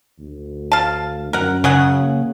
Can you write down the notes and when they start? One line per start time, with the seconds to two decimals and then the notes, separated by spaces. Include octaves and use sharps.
0.19 D2
0.72 F5 A5
1.33 F#2 A#4 F#5
1.64 C#3 F#3 G#4 F#5
2.02 A#3